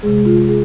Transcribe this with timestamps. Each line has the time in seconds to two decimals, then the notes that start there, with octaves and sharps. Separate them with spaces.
0.03 C3 G#3 G#4
0.26 F4
0.48 G#4